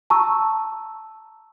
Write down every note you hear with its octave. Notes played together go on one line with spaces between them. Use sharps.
A5 A#5 C#6 E6